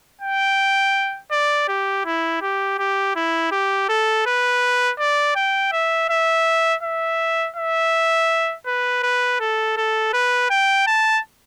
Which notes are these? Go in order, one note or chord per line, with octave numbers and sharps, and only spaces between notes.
G5
D5
G4
E4
G4
G4
E4
G4
A4
B4
D5
G5
E5
E5
E5
E5
B4
B4
A4
A4
B4
G5
A5